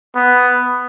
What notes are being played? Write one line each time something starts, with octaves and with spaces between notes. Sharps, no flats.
B3